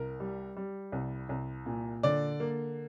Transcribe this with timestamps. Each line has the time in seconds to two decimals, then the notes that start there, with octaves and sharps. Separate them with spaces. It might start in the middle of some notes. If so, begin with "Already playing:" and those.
Already playing: C2 A#4
0.20 G3
0.57 G3
0.92 C2
1.29 C2
1.66 A#2
2.03 D3 D5
2.40 A#3